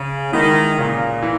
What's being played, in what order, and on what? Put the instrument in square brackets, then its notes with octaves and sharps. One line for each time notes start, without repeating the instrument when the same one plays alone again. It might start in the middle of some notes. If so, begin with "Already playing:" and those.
Already playing: [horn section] C#3
[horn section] D#3 [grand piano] E3 G#3 B3 E4
[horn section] A#2 [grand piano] C#3
[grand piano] E3